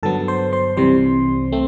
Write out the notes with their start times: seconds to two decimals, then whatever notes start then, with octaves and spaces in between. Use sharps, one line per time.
0.03 G2 D3 F#3 B3 A4 A5
0.28 C5 C6
0.53 C5 C6
0.77 C2 C3 E3 G3 C4 C5 C6
1.52 A3 C4